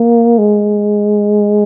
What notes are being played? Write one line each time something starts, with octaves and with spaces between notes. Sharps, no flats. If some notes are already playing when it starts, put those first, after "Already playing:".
Already playing: A#3
G#3